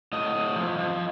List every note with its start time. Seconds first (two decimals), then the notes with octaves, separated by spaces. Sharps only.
0.13 A2 D#5
0.35 A2
0.56 F3
0.78 F3